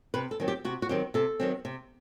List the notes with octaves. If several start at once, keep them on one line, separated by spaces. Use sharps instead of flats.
C3 B4
A4
D#3 F#3 C4
G4
C3 F#4
F#4
D#3 F#3 C4 G4
C3 A4
D#3 F#3 C4
C3